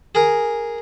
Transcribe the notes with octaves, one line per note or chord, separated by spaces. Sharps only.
G#4 A#4